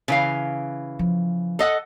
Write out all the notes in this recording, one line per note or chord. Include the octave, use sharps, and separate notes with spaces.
C#3 E3 F5
F3
A4 D#5 F#5